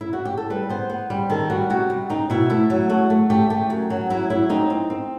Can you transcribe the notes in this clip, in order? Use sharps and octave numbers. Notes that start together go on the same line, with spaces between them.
E4
F#4
G4
A4
G3 B4
B3 C5
B3
G3
D#3 A4
G3 F#4
C3 F#4
G3
C4 D#4
B2 E4
A3 E4
F#3
A3 F#4
A3
A3 G4
A3 G4
F#2
F#3
F#3 E4
F#3 E4
C4 D#4
C4
C4